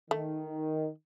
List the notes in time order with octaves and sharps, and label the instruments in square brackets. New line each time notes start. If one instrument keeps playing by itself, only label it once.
[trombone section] D#3 [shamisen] A3